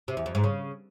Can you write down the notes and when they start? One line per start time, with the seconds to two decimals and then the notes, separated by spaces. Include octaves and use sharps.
0.08 C3
0.17 E2
0.26 F2
0.35 G#2
0.44 C#3